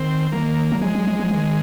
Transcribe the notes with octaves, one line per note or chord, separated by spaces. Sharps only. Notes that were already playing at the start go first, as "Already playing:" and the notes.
Already playing: D#3 C4
D#3 A#3
F#3
F3 G#3
F#3
F3
F3
D#3